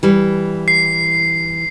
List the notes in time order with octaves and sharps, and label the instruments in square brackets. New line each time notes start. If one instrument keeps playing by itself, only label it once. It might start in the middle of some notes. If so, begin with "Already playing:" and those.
[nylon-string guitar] E3 G3
[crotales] C7